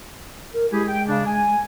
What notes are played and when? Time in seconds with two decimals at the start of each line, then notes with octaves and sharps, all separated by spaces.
0.54 A#4
0.72 G#3 E4 G4 G#4
0.87 G5
1.08 C#3 D4
1.26 G#5